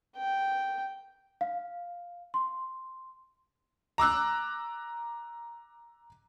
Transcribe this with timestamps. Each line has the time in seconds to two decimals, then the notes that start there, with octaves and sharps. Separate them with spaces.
0.17 G5
1.41 F5
2.34 C6
3.98 A#5 D6 E6 F#6